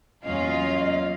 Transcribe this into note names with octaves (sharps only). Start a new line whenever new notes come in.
E2 F#3 A#3 C#4 F4 D#5 F5